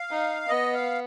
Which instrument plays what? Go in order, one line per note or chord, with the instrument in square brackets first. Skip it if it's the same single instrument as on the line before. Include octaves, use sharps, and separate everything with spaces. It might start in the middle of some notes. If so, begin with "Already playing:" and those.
Already playing: [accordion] F5
[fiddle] D#4
[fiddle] B3 [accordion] D#5
[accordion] F5